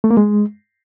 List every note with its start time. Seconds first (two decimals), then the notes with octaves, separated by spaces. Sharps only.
0.04 A3
0.11 A#3
0.17 G#3